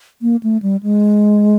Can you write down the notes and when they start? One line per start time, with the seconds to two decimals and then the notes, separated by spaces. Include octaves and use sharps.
0.22 A#3
0.43 A3
0.62 G3
0.83 G#3